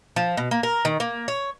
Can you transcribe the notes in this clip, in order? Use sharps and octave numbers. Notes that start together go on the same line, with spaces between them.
F3
B2
A#3
A#4
D#3
A#3
C#5